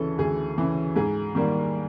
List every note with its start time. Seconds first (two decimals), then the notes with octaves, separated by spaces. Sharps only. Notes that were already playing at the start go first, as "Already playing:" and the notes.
Already playing: D2 C#3 E3 A4
0.18 D2 G#4
0.58 C#3 E3
0.96 G#2 G#4
1.35 D#3 G3 A#3